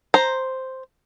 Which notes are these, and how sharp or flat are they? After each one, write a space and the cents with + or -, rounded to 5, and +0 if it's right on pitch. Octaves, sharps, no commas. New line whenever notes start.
C5 +0 A#5 +0